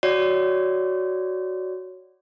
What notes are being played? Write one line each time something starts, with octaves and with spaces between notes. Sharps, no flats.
F#4 C#5 D5